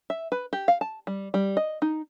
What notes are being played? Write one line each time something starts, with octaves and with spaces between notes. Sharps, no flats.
E5
B4
G4
F5
A5
G3
G3
D#5
D#4